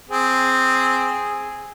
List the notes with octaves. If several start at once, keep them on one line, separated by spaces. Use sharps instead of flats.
C4 G#4